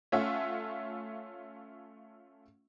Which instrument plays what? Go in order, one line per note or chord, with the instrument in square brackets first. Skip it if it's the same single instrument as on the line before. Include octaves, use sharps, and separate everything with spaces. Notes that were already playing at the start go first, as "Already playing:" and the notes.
[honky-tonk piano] A3 C#4 F4 E5 F#5